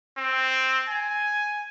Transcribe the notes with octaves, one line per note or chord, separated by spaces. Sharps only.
C4
G#5